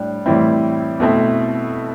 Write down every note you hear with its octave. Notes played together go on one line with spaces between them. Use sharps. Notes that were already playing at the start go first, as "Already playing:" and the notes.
Already playing: A2 G3 D4
A2 E3 G3 C4 E4
B2 A3 C4 E4